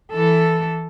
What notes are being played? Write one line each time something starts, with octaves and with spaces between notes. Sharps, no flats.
E3 A4